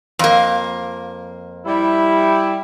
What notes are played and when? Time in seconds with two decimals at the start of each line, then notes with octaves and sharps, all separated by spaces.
0.19 F2 A#3
1.66 G3 E4